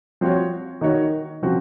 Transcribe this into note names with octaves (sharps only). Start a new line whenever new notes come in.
F3 C4 F#4 C#5
D#3 A#3 D#4 F#4 C#5
C#3 F3 C4 F#4